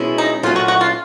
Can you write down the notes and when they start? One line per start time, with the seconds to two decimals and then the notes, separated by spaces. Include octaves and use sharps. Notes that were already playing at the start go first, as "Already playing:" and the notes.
Already playing: B2 G#3 C#4 E4
0.18 D#4
0.43 A#2 F#3 A3 C#4 F4
0.56 F#4
0.68 F#4
0.81 F4